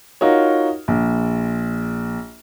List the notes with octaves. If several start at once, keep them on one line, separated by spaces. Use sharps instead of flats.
D#4 F4 F#4 A#4 C#5
A#1